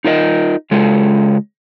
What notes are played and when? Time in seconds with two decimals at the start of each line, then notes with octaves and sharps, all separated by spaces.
0.04 D#4 F4 A#4 C#5 D#5
0.71 C#3 G#3 F4 A4